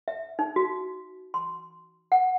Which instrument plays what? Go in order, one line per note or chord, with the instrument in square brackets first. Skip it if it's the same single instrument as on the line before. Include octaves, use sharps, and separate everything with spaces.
[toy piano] E5
D#4
F#4
C6
F#5